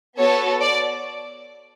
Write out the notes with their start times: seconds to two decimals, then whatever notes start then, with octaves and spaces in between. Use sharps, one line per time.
0.17 B3 F#4 A4 C#5
0.60 D5